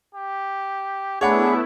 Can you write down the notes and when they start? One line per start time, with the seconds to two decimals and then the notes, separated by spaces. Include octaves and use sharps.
0.15 G4
1.21 A3 B3 D4 E4 G#4 C#5 F#5 B5